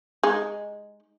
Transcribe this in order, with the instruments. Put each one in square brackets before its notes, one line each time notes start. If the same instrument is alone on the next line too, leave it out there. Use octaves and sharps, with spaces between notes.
[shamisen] G#3 D#4